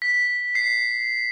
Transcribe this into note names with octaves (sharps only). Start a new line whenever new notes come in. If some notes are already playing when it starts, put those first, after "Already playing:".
B6
C7